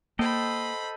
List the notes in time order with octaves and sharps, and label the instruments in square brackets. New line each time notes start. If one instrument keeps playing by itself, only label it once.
[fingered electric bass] A#3 [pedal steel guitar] A4 D#5 G5 [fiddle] C5 B5